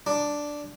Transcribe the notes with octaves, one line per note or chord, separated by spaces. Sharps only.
D4